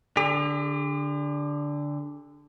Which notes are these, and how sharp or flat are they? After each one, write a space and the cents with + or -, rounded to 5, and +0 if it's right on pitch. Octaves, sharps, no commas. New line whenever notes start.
D3 -5 G4 +45